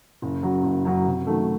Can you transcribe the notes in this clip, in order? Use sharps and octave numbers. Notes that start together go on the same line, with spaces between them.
F#1
F#2 F#3
F#1
F#2 F#3
C3
D#3 F#3 A3